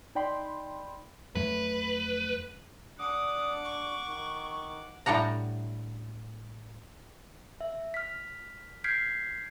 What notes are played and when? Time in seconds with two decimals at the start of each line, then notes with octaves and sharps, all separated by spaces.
0.15 D#4 D5 G5 B5 C6
1.35 F2 F#3 A3 B4
2.99 D4 F#5 D6 D#6
3.64 C#6
4.08 D#3
5.06 A2 G3 D4 F#5 A#5
7.61 E5
7.94 F6 B6
8.84 F6 G6 G#6 B6 C7 D7